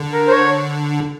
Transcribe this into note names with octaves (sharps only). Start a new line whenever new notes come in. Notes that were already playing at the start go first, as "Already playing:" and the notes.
Already playing: D3
A#4
C5
C#5